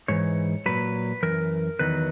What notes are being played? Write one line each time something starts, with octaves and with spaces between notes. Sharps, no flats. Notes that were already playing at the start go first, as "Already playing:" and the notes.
G#2 E3 C#5
A#2 F#3 B4
F#2 E3 A#4
E2 D#3 F#3 B4